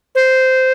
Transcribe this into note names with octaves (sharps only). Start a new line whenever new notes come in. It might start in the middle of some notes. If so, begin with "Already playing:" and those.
C5